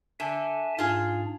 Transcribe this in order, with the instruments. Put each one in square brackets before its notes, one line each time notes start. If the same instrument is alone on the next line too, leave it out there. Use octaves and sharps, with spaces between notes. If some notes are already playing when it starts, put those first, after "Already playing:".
[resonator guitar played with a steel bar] D3 [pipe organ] E5 G#5 A5
[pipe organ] G#2 D4 [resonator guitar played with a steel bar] F4 G#4